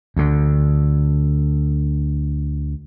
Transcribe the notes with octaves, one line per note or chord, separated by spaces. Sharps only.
D2 D3